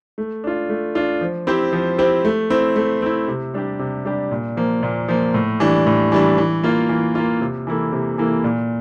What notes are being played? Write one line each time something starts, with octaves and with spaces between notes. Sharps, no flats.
A3
D4 F4
A3
D4 F4
F3
C4 E4 G4 C5
F3
C4 E4 G4 C5
A3
C4 E4
A3
C4 E4
C3
G3 D4 G4
C3
G3 D4 G4
A#2
F3 A#3
A#2
F3 A#3
A2
E3 G3 D4
A2
E3 G3 D4
E3
A#3 F4
E3
A#3 F4
C3
E3 A#3 E4 A4
C3
E3 A#3 E4 A4
A#2